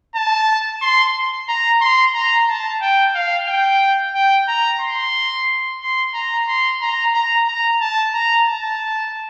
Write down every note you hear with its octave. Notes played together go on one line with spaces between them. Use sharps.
A5
C6
A#5
C6
A#5
A5
G5
F5
G5
G5
A#5
C6
C6
A#5
C6
A#5
A#5
A#5
A5
A#5
A5